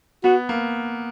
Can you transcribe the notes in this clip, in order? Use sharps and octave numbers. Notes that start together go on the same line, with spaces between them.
B3 F#4
A#3